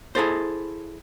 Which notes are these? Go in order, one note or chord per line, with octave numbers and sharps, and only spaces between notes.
E4 G#4 A4 C5